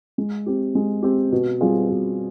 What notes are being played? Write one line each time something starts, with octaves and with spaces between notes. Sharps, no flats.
G#3
C4 G4
G#3
C4 G4
B2
G3 C4 F4 G#4
B2